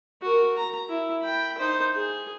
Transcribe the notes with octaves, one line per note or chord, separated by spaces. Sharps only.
F#4 A#4
A#5
E4
G5 B5
D#4 C5
G#4